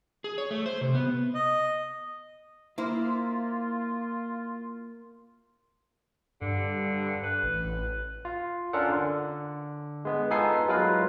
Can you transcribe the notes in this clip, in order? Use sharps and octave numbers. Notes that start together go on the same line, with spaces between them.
G#4
C#5
A3
C5
C3
B3
D#5
A#3 E4 F4 A#4 C5
G2 D3
B4
A1
F4
C#4 D4 F4 A4 A#4 F#5
D3
G#3 B3
B3 D#4 F4 A4 G#5 C7
F#3 G#3 E4 F4 A#4 B4